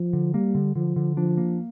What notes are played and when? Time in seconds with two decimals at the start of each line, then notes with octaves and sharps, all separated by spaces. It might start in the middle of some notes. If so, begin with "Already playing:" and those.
Already playing: F3
0.13 D3
0.34 G3 A#3
0.55 D3
0.76 D3 F3
0.96 D3
1.17 F3 D4
1.37 A#3